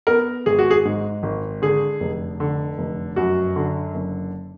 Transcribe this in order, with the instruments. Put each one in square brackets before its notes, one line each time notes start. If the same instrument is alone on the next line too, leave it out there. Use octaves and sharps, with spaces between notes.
[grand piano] B3 A#4
G#1 G#4
F#4
G#4
G#2
G#1
D3 G#4
F1
D3
F1
F#2 F#4
D3
F#1